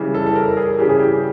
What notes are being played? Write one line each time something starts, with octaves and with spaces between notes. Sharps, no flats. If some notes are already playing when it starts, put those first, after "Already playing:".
Already playing: C#3 E3 G3
A4
A4
A#4
G#4
C#3 E3 G3 G4
G#4
G4